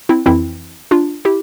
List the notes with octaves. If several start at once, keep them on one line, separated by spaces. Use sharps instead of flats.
C4 E4
F2 E3 C4 E4
D4 F4
E4 G4